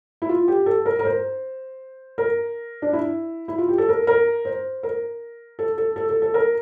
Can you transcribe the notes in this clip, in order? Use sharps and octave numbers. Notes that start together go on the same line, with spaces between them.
E4
F4
G4
A4
A#4
A#4
C5
A#4
D4
E4
E4
F4
G4
A4
A#4
A#4
C5
A#4
A4
A4
A4
A4
A4
A#4